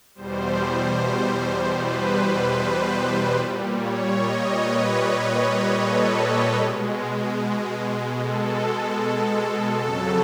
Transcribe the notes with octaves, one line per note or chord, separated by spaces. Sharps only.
E2 B2 G3 C5
B4
A#2 G3
C#5
D#5
B4
B4
A4
B2 G#3
A4
F2 C#3 F#3 A4